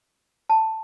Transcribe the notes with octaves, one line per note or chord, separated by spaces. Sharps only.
A5